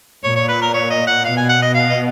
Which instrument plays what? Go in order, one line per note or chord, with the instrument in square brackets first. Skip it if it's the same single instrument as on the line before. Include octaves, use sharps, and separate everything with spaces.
[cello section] A#2 [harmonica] C#5
[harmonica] C#5
B4
A#4
C#5
D#5
F#5
[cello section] B2 [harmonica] F5
[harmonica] G#5
F#5
D#5
F5
D#5